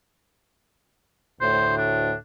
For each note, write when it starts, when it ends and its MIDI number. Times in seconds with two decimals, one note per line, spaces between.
1.41 2.13 38
1.41 2.13 45
1.41 1.75 72
1.77 2.13 62